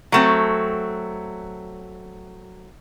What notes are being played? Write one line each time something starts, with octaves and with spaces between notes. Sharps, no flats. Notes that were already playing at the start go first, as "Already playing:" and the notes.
F#3 A3 C4